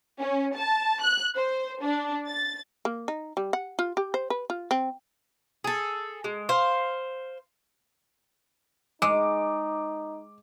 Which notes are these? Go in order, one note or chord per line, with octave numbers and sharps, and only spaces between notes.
C#4
A5
F#6
C5
D4
A6
A#3
D#4
G3
F#5
F4
G4
C5
B4
F4
C4
G#4 A4
G#3
C5 F5
G#3 D#4 D6